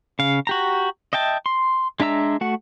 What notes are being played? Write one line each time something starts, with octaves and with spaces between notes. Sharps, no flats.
C#3 F5
F#4 G4 A#5
D#5 E5 G5 A5
C6
G#3 D4 E5 A#5 E6
A3 F#4 F#5